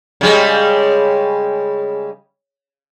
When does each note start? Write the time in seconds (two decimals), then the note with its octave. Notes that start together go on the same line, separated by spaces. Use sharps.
0.21 C#3 G3 G#3